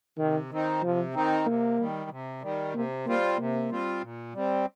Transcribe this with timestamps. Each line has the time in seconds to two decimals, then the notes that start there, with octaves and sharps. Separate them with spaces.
0.18 C3 D#3
0.50 D#3 C4 D#4
0.82 C3 F3
1.14 D#3 C4 D#4
1.46 C3 A#3
1.78 D#3 G3
2.11 C3
2.42 D#3 G3
2.74 C3 A#3
3.06 G3 A#3 C4 F4
3.38 C3 A#3
3.70 G3 C4 F4
4.02 A#2
4.34 G3 C4